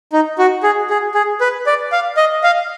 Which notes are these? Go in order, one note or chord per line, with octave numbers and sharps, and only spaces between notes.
D#4
F#4
G#4
G#4
G#4
B4
D5
F5
D#5
F5